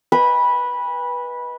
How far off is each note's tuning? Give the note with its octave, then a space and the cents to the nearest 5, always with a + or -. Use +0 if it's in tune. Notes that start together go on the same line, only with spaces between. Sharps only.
B4 -15 D#5 +20 G#5 -45